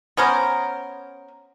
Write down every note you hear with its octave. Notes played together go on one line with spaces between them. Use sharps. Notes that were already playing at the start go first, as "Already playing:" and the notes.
B3 C#4 A#4 C5